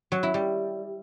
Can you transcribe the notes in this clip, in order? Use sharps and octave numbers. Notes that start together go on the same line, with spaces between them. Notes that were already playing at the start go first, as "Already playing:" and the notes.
F#3
E4
G3